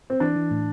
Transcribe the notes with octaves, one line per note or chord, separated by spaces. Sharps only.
C4
E3 D4
E3
A2